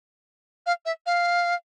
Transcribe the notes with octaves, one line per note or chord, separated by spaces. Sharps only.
F5
E5
F5